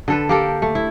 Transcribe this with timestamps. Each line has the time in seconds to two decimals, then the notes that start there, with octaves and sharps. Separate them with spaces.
0.08 D3 A4 B4
0.29 A#3 G4 A4
0.62 A3
0.75 E4